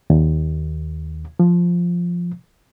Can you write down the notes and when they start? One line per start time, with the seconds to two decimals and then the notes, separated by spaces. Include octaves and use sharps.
0.10 D#2
1.40 F3